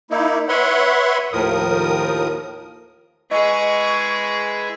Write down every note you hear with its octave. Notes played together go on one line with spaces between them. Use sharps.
A#3 D#4 E4
B4 C#5 E5 F#5 B5 C6
D#2 A2 F3 A#4 D#6
G#3 E4 G#4 B4 D#5 G#5 C#6